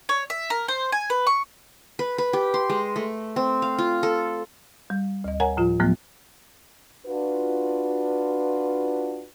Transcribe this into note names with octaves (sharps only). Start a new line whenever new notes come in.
C#5
E5
A#4
C5
G#5
B4
C#6
B4
B4
G4
C6
G#3
A3
C4
F5
F4
A4
G3
D2 D#5
A#4 C#5 F5 F#5 G#5 A#5
A2 F3 F4
A2 F3 F#3 A3 B3
D4 F4 F#4 B4